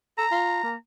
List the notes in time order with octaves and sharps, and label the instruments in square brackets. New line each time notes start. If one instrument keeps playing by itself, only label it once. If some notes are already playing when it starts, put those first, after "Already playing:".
[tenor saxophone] A4 [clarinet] A#5
[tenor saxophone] F4
A#3